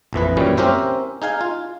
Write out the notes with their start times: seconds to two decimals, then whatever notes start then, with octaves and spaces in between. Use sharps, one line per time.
0.13 A#1 F2 E3 B4
0.37 F#2 A#2 E3 G3 C#4
0.57 C4 C#4 G4 A#4 C5 E5
1.22 D#4 G#4 F5 G#5
1.41 F4